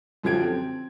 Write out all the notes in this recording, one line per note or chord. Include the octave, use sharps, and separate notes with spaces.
F#2 D3 F3 G4 G#6 D7
C4